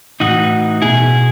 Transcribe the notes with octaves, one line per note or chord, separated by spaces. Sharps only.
A2 E3 D#4 F#4
B2 E4 G#4